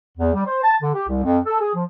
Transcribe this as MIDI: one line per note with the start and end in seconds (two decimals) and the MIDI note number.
0.18 0.33 40
0.34 0.46 55
0.46 0.61 72
0.62 0.75 81
0.82 0.91 50
0.94 1.07 67
1.08 1.20 36
1.24 1.39 41
1.46 1.59 69
1.60 1.73 68
1.74 1.84 53